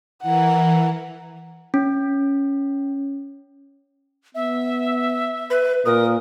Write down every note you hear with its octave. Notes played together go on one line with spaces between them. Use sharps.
E3 A#4 F#5
C#4
B3 E5
B4
A#2 A#4 D#6